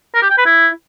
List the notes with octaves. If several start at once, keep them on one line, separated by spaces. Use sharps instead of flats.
A#4
G4
G5
B4
E4